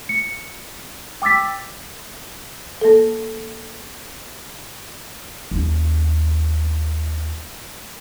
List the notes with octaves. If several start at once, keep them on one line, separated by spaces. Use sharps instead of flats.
C#7
G5 D6 E6 A6 B6
A#3 A4
D#2 C#4